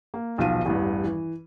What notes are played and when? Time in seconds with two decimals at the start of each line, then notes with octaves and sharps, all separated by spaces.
0.14 A#3
0.38 D#1 B1 D#3 F3 F5 D#7
0.66 A1 E2 G2
1.04 E3